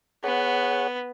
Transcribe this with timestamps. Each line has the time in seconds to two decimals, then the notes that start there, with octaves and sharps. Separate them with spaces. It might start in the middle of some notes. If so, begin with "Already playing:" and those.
0.24 B3 G#4 C#5 F#5